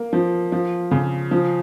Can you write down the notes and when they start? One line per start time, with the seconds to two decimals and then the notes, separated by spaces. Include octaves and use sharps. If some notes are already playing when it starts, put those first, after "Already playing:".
Already playing: A#3
0.13 F3
0.52 F3
0.91 C#3
1.31 F3